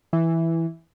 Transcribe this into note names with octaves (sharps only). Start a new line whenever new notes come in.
E3